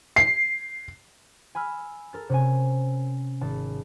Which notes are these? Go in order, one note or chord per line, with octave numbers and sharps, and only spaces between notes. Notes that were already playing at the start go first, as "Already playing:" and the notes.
C7
G#5 B5 E6 F6
A4 A#4 A6
C3 C#4 G#5
G#1 A5